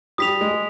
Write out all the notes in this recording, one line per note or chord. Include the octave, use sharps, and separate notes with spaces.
G3 D#6 B6 F7
G#3